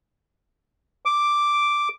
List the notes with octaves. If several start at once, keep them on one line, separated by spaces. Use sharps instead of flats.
D6